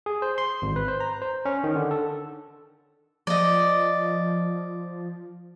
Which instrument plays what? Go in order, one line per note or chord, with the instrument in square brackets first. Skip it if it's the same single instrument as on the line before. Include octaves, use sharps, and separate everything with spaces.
[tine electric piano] G#4
C5
C6
G#1
B4
C5
A#5
C5
C#4
D#3
D3
A4
[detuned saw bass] F3 [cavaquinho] D5 D#5